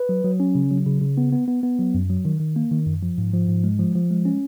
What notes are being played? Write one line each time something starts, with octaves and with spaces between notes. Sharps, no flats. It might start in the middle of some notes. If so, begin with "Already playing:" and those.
Already playing: B4
F#3
F#3
C#4
C#3
F#3
C#3
C#3
B3
B3
B3
B3
F#3
F#2
F#3
D#3
D#3
A#3
D#3
F#2
F3
G#2
F3
G#2
G#3
F3
F3
G#3
C#4